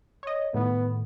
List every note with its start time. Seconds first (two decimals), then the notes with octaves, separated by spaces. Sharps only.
0.23 C#5 D#5
0.54 A2 D#3 B3